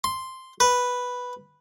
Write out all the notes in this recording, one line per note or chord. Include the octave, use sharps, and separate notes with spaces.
C6
B4